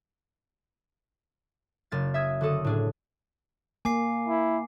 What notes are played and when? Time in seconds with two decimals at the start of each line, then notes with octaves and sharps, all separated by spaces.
1.92 F#1 F6 A6
2.14 E5 D#6 E6 G#6
2.41 D3 F#4 A4 D#6
2.65 A2 D4 G#4
3.85 A#3 G#5 D6 C7
4.28 E4